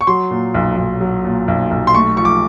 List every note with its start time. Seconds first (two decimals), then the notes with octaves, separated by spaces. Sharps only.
0.01 C#6
0.07 F#3 C6
0.31 A#2
0.54 B1
0.77 B1
1.01 F#3
1.24 A#2
1.48 B1
1.71 B1
1.87 C6
1.95 A3 C#6
2.17 F3 C#6
2.25 D6